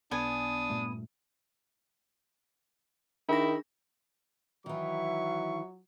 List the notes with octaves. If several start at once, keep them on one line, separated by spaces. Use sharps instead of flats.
B1 B3 D4 G#5 D#6
G2 A#2 A3
D#3 D4 E4 G#4 A#6
D#3 E3 F#3 E5 C#6